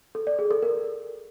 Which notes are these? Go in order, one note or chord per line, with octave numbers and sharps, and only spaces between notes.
A4
D5
G#4
A4
A#4